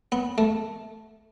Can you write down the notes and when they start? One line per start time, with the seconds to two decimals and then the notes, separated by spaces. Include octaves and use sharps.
0.12 B3
0.38 A3